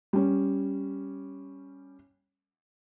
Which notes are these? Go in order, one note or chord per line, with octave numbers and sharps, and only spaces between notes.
G3 C#4